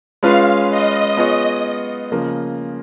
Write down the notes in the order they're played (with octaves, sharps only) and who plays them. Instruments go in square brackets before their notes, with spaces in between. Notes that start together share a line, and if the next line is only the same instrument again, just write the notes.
[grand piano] G#3 C#4 F4 B4 [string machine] F5
[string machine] D#5
[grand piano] B3 F4 G#4 C#5
C#3 F3 A#3